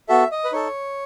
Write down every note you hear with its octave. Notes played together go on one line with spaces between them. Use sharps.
B3 F#4 A4 E5
D#5
B4
D#4 A4 C#5